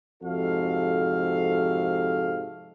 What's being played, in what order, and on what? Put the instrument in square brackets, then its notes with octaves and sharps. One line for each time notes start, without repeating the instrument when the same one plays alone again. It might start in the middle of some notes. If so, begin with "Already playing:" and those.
[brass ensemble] F2 G#2 C3 F#4 A4 F5